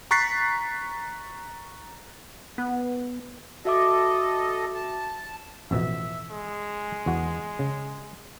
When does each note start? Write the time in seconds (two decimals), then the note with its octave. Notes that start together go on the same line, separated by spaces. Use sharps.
0.11 A#5 C#6 F#6 A6 B6 C7
2.58 B3
3.65 F#4 A4 D#5 E5 D6
4.75 A5
5.71 A1 F2 B2 E5
6.31 G#3
7.06 E2 F#4
7.59 C#3